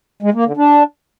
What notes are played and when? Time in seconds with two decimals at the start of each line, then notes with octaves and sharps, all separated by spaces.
0.22 G#3
0.34 A#3
0.45 D3
0.57 D4